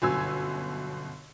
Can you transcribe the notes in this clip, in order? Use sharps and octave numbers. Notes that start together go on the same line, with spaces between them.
G1 F#2 B2 G#5 E6 G#6